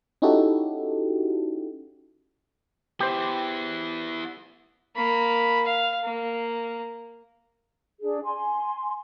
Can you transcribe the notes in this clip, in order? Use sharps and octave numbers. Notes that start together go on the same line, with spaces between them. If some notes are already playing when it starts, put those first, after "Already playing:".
C#4 D#4 E4 F#4 G4 A4
B3 E4 G4 C5
A#3 B5
F5
A#3
D4 G#4
G#5 C6